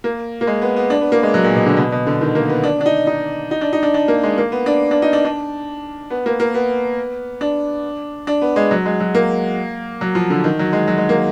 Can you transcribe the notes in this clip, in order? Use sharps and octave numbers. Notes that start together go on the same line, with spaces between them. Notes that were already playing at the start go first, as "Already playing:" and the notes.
A#3
A#3
G#3
B3
B3
D4
B3
A#3
G#3
F#3
A#2
B2
D3
B2
B2
D3
D#3
A#3
B3
D4
D4
D#4
D#4
D#4
D4
D#4
D4
D4
A#3
G#3
A#3
B3
D4
D4
D#4
D4
D4
B3
A#3
A#3
B3
D4
D4
B3
G#3
F#3
G#3
F#3
A#3
F#3
F3
D3
D#3
F#3
G#3
F#3
G#3
A#3